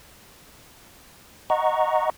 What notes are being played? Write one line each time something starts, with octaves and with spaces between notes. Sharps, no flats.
D#5 F#5 A#5 C#6